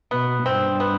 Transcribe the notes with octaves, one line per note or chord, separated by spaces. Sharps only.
B2 B3
G2 C4
B3